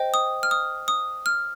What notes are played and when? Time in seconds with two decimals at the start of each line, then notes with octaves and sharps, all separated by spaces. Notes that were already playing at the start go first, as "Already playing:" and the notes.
Already playing: C5 D#5 G5
0.14 D#6
0.43 F6
0.51 D#6
0.88 D#6
1.26 F6